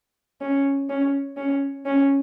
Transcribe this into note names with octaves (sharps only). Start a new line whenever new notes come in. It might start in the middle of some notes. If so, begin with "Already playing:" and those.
C#4
C#4
C#4
C#4